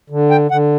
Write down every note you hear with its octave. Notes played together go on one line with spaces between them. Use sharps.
D3
G5
D3 F#5